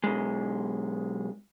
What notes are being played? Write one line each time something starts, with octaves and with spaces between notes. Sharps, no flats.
B1 G#3